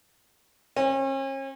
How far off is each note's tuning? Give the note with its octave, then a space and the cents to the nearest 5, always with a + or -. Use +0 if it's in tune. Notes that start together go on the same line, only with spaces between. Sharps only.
C#4 -40